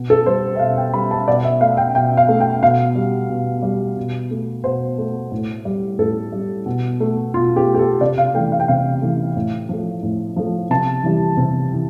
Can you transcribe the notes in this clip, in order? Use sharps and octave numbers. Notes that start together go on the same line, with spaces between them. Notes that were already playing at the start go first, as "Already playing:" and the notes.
Already playing: B2
A4
G3 C5
E5
B2 F5
G5
G3 B5
A5
B2 D5
E5
A3 F5
G5
B2 G5
F5
A3
G5
B2 F5
G3
B2
G3
B2
A3
B2 C5
A3
A2
G3
A2 A4
G3
B2
A3
B2 F4
G4
A3
G4
A4
C3 D5
F5
E3 A3 G5
F5
G5
C3 F5
E3 A3
A2
F3 A3
A2
F3 A3
C3 A5
E3 G3
C3
E3